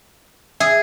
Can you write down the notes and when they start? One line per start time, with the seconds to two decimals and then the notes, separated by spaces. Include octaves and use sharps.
0.60 G#4 E5